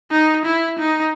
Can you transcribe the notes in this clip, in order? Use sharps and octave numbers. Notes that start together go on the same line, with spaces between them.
D#4
E4
D#4